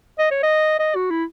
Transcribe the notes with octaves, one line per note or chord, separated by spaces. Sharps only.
D#5
C#5
D#5
D#5
F#4
E4